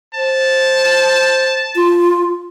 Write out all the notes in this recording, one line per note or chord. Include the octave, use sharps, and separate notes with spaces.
C5 A5
F4